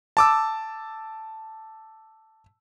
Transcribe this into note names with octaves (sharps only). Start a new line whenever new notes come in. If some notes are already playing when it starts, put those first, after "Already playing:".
A5 D6 E6